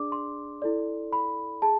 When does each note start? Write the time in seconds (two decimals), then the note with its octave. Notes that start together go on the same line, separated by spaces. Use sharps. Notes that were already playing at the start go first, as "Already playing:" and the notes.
Already playing: D4 G#4 D5 D6
0.12 C6
0.62 E4 A4 D5
1.13 B5
1.62 G#4 A5